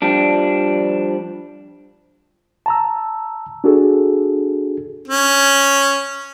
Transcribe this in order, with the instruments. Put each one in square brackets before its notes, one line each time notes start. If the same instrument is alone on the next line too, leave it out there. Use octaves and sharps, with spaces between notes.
[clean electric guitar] F3 G3 D4
[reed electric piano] A5 A#5 E6
D4 F#4 G#4 A4
[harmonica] C#4